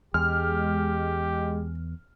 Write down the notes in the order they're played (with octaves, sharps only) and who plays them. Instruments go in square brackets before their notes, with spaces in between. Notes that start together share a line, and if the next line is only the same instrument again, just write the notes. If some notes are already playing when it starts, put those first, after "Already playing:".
[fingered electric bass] E2 [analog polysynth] G#3 [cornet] G4 [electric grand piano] F6